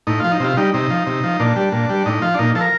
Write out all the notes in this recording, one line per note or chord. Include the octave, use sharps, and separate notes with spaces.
A2 D#4
F3 F4
D#4
C3 F4
G3 D#4
C3 D#4
F3
C3
F3
A#2 D4
G3
A#2
G3
A2 D#4
F3 F4
D4
A#2 D#4
F3 A4
A#4